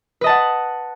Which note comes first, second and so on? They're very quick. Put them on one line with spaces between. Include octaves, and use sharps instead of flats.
B4 D#5 A5 F#5